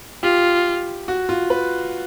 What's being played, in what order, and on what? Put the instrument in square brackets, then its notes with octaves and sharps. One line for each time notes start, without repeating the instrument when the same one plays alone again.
[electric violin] F4 [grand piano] G4
[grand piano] F#4
F4
B4